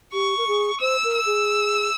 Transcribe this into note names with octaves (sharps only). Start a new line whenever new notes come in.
G4 C#6
A#4
G#4
C5 E6
A#4
E6
G#4